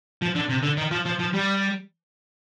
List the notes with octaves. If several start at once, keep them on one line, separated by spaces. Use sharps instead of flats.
F3
D3
C3
D3
D#3
F3
F3
F3
G3